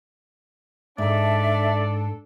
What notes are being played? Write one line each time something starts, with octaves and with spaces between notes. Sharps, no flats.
G#2 D4 A4 D5 E5